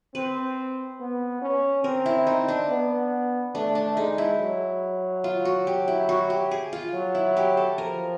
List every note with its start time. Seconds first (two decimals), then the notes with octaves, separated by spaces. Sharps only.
0.15 C4 B4
1.00 B3
1.42 C#4
1.84 C4 A#4
2.06 E4
2.27 D#4
2.48 D4
2.69 B3
3.55 A3 D4
3.75 D4
3.97 G#3 D#4
4.18 E4
4.39 F#3
5.24 F4
5.45 F#4
5.67 G4
5.88 E4
6.09 F#4
6.30 G4
6.51 G#4
6.73 F4
6.93 F#3
7.15 E4
7.37 G4
7.57 A4
7.78 F3 A#4